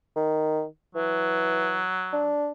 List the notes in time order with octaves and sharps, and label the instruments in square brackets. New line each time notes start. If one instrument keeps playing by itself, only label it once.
[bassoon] D#3
[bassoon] E3 [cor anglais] F#3
[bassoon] D4